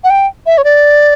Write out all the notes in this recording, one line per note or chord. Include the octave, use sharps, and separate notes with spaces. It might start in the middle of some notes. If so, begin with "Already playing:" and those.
F#5
G5
E5
C#5
D5